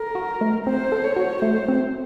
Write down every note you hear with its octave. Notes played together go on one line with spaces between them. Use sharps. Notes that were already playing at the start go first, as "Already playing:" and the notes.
Already playing: A4 A#4
F#4
A3
C4 C5
A4
C#5
F#4
A3 C5
C4